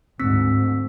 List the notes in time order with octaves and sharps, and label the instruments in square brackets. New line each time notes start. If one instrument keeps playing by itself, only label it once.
[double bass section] D2 G#2 [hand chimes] C4 E6 B6